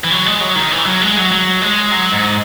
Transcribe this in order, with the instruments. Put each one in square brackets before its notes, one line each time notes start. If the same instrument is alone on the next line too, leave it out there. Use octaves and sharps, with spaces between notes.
[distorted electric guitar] E3
F#3
G#3
F#3
D#3
E3
F#3
G#3
F#3
F#3
G#3
F#3
G#2